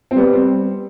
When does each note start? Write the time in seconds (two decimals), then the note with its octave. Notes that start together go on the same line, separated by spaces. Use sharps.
0.11 C4
0.16 G3 B3
0.33 C4